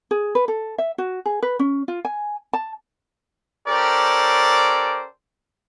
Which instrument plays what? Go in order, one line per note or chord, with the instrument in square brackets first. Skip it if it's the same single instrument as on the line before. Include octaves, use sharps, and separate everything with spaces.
[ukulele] G#4
B4
A4
E5
F#4
G#4
B4
C#4
F4
G#5
A5
[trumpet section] C#4 G4 A4 A#4 C5 D5